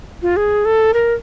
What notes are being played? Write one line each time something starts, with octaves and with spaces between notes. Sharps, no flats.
F4
G#4
A4
A#4